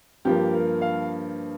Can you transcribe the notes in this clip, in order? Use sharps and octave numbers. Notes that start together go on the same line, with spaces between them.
G2 F3 A#3 G4
A#4
F5